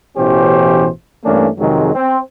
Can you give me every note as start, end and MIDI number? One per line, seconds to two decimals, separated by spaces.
0.16 0.88 33
0.16 0.88 47
0.16 0.88 52
0.16 0.88 61
0.16 0.88 67
0.16 0.88 72
1.25 1.48 43
1.25 1.48 52
1.25 1.48 57
1.25 1.48 58
1.25 1.48 61
1.25 1.48 62
1.58 1.94 41
1.58 1.94 48
1.58 1.94 51
1.58 1.94 54
1.58 1.94 56
1.94 2.20 60